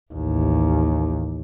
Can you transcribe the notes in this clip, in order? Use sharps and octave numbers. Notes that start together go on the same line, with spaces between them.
A1 D#2